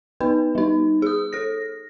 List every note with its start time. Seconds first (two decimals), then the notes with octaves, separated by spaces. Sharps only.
0.20 B3 D#4 B4
0.55 G3 D#4
1.02 G#4 D#6
1.33 A4 A#6